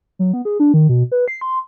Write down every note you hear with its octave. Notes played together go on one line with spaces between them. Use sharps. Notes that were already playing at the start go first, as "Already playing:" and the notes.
F#3
B3
G#4
D4
D#3
B2
B4
C7
C6